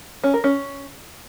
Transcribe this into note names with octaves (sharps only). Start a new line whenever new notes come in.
C#4
A#4
C#4